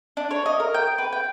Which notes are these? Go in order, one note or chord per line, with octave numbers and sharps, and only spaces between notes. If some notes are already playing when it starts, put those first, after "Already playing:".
D4
C#5
D#5
A#4
G5
B4
G5